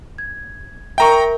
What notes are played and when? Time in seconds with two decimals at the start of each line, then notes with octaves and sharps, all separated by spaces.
0.18 G#6
0.98 A#4 E5 G5 A#5 C#6